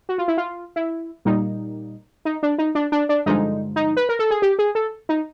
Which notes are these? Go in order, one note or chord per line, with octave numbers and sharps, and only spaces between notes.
F#4
F4
E4
F4
E4
A#2 G3 A#3 D#4
D#4
D4
D#4
D4
D4
D4
G2 D3 F3 G#3 D#4
D#4
B4
A#4
A4
G#4
G4
G#4
A4
D#4